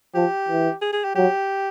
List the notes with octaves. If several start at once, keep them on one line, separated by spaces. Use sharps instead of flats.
F3 G4
E3
G#4
G#4
G4
F#3 G4